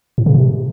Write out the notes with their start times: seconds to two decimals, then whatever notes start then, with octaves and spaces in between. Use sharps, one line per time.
0.18 A2
0.26 C#3
0.35 C3